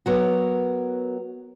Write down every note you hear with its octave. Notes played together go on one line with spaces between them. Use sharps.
F#3 B3 F#4 A#4 C#5